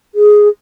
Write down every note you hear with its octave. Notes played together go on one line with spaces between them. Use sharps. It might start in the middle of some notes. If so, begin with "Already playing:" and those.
G#4